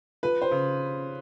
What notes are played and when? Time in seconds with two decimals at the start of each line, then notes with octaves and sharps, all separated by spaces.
0.23 F3 B4
0.42 C5
0.51 C#3